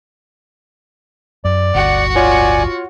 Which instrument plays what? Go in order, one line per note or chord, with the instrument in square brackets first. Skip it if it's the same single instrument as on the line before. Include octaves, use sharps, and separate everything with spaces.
[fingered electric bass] F#2 [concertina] D5
[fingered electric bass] D1 G1 [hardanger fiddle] F#4 F#5
[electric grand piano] F4 C#5 [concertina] D5 G#5